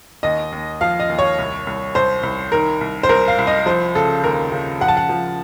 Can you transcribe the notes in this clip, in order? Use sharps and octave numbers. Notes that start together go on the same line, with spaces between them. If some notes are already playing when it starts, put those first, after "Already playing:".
D#2 D#5
D#2
F3 F5
D#5
D#2
C#5
C2
C2
C2 C5
C2
D#3 A#4
C2
C5
C2 A#4
F5
C2
D#5
F3 C5
C#3 A4
D#2 A#4
C#3
F3 F#5
A5
F#5
F3